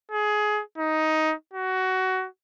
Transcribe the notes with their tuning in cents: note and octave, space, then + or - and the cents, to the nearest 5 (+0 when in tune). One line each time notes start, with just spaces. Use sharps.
G#4 +20
D#4 +10
F#4 +20